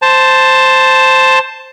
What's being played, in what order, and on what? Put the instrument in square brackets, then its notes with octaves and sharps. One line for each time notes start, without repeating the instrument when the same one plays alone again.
[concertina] C5 A5